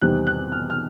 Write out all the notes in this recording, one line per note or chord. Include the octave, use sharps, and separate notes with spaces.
E2 C3 D#3 G3 C4 F#6
F#6
F6
F6